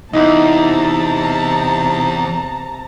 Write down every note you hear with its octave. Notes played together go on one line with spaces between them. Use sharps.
E2 C3 D#4 E4 A5 A#5